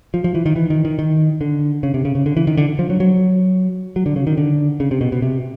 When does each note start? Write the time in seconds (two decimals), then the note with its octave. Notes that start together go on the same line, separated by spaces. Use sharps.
0.14 F3
0.24 F3
0.35 E3
0.46 D#3
0.56 E3
0.70 D#3
0.85 D#3
0.99 D#3
1.41 D3
1.83 C#3
1.94 C3
2.05 C#3
2.15 C#3
2.26 D3
2.37 E3
2.47 D#3
2.57 D3
2.79 F3
2.90 F#3
3.00 F#3
3.96 F#3
4.06 D3
4.16 C#3
4.27 D#3
4.38 D3
4.80 C#3
4.91 C3
5.01 B2
5.12 B2
5.22 C3